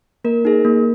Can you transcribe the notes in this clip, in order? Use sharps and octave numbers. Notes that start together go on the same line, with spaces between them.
A#3 A#4
D#4 G#4
A#3